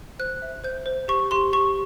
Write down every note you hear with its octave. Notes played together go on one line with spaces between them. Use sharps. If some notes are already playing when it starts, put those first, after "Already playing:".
C5 F#6
E5
C5 G6
C5
G4 C#6
G4 C6
G4 C#6